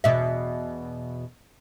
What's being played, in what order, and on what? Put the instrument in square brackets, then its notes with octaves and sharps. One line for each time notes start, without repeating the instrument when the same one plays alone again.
[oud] E2 B2 E5